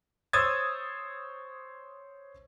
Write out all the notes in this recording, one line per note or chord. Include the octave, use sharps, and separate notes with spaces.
C5 C#5 D#6 E6 G#6 A6